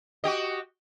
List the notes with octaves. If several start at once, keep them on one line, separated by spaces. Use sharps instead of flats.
F#4 G4 D#5